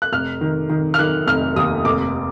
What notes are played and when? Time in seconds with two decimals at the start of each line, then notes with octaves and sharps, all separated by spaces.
0.02 F#6
0.12 F1 F6
0.41 D#3
0.69 D#3
0.94 F6
0.99 D#3 F#6
1.27 F1 F6
1.56 D#2 D#6
1.85 F1 D6